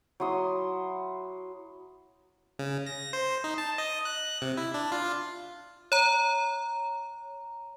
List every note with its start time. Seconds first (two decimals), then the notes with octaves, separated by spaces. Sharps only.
0.20 F#3 E4 C6 D#6
2.59 C#3
2.87 A#6
3.13 C5
3.44 D#4
3.58 A5
3.78 D#5
4.05 F#6
4.42 C3
4.57 E4
4.74 D4
4.92 F4
5.92 C#5 A#5